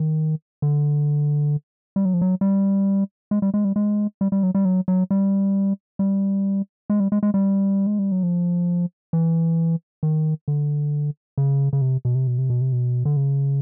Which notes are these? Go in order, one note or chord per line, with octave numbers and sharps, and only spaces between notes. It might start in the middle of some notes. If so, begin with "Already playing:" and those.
Already playing: D#3
D3
G3
F#3
F3
F#3
G3
G#3
G3
G#3
G3
G#3
G3
G3
F#3
G3
F#3
F#3
G3
G3
G#3
G3
G#3
G#3
G3
G#3
G3
F#3
F3
E3
D#3
D3
C#3
C#3
C3
B2
C3
B2
C3
B2
C3
B2
D3
C#3